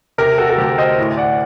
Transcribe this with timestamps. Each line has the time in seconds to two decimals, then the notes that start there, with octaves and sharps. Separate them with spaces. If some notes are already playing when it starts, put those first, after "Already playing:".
0.18 C3 G4 A#4
0.38 F#4 A4
0.49 A4
0.58 D2 G4
0.78 C5 D#5
0.98 A2
1.17 D5 F#5